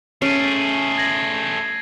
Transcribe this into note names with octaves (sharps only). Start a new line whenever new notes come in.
A3 C#4 G#4 C7 D7 D#7
G#6 A#6 F#7